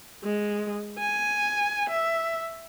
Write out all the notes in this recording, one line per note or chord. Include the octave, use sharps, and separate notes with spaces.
G#3
G#5
E5